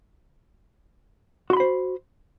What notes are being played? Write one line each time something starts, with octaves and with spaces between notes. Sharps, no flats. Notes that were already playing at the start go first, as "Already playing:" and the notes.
F#4 C5 B5 C6